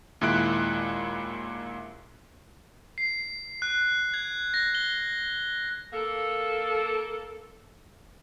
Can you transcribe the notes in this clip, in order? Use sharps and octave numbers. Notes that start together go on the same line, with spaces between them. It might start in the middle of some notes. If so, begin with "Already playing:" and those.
D#2 A#2 G#3 E4 F#6 D7
C7
F#6
G#6
A#6
G7
A#3 A4